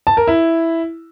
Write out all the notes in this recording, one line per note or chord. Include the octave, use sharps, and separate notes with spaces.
A5
A#4
E4